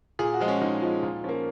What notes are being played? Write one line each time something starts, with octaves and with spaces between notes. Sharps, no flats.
A#2 G#4
F#4
F3 G#3
C#4
A#2 D#4
F3 G#3
A#2
F3 A#3 C#4